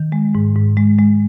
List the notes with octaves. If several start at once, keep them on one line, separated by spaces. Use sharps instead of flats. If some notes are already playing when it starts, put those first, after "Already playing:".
Already playing: D#3
G#3
G#2
G#2
G#3
G#3